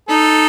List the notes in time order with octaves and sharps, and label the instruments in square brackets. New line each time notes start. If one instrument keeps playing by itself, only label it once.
[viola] D#4 [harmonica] A4